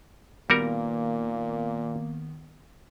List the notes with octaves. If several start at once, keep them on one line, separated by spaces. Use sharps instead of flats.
A#2 D#3 G3 A#3 B3 F#4 A#4